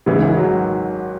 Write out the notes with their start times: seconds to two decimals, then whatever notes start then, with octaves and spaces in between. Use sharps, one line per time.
0.06 G#2 C#3 E3
0.22 G#1
0.37 F#3